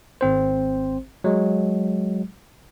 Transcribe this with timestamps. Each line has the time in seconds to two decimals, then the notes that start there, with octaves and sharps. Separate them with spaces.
0.21 G#1 C4 C5
1.24 F#3 G#3